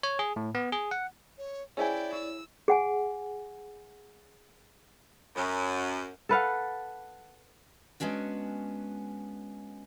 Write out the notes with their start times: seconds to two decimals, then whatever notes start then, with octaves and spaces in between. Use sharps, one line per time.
0.03 C#5
0.19 G#4
0.36 A2
0.55 B3
0.72 G#4
0.91 F#5
1.38 C#5
1.77 C#4 E4 G#4 C5 D5 E5 G5 G#5
2.13 E4 E6
2.68 G#4 F#5 G#5
5.36 F#2
6.29 A4 B4 F5 F#5
8.00 G#3 B3 C#4 D4 F#4